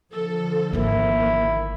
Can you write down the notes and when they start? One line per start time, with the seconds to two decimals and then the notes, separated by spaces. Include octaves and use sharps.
0.12 D3 F3 A4
0.73 G#1 D#3 A#3 E4